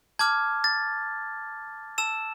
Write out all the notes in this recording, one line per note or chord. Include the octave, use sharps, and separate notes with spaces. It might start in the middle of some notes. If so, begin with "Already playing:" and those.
A5 D6 F6 G#6
A6
A5 E6 E7